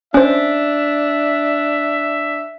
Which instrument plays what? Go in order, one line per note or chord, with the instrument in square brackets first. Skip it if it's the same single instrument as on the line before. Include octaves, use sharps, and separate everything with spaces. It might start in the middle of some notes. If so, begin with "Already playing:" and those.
[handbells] C#4 C5 [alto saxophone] D4 [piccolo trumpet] E5